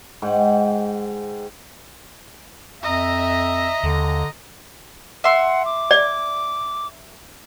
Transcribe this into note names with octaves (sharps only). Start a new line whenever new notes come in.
G#2 F#5 G5
F2 D#5 E5 A#5
D#2 D3
E5 F#5 C6
D6
D5